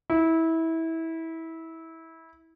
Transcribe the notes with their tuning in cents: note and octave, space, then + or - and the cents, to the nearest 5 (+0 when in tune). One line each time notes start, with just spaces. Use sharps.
E4 -20